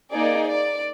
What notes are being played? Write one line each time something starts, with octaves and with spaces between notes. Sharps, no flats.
A#3 D#4 G#4 D5
D5